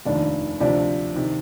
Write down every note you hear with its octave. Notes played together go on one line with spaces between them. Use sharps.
F1 D#2 D#3 D4
D2 C3 F3 D4
C3 D#3